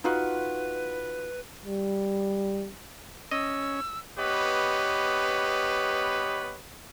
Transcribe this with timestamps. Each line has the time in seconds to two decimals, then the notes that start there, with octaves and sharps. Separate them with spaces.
0.04 D#4 F4 F#4 B4
1.65 G3
3.31 C#4 D#5 E6
4.18 B3 G4 B4 C#5 D#5